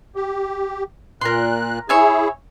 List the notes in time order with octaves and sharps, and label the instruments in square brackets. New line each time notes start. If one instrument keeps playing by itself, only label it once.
[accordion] G4
[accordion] A#2 F#6 [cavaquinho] A#4 C6
[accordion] E4 G#4 [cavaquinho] C#5 E5 G#5